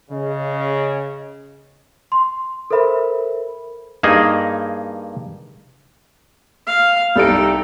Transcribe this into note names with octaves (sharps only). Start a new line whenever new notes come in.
C#3 D#5
C6
A4 A#4 C5 E5 B5
G2 A#3 D#4 G#4 D#5 G#5
F5
C2 G3 D#4 A4 D7